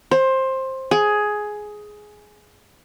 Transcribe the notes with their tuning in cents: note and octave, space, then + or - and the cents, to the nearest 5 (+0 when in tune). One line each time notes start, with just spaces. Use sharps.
C5 +15
G#4 +10